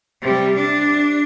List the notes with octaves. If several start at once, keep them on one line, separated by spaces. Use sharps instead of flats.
C3 G3
D4